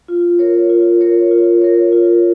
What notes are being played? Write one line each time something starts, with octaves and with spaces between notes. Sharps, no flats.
F4
A#4 C#5
F4
A#4 C#5
F4
A#4 C#5
F4